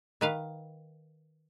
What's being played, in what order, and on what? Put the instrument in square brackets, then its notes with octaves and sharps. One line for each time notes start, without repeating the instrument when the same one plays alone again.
[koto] D#3 B4 F5